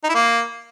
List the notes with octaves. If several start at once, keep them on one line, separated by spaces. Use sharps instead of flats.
D#4
E4
A#3